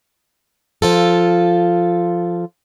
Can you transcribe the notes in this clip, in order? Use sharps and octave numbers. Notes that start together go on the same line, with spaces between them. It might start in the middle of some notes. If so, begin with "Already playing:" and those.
F3 F4 A4